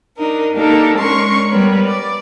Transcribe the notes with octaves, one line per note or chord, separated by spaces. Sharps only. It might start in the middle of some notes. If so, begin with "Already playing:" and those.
D4 D#4 A#4
A#3 D4 D#4 G4 A4 A#4
G#3 C#4 D4 A#4 C6 C#6
G3 B3 A#4 B4 C#5
D5